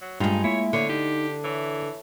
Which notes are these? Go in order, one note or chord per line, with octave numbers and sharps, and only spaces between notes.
F#3
G2 G#3 D#4 F4
A#3 E4 C#5 E5
D3 C#5
D#4 G4
E3 C#5 E5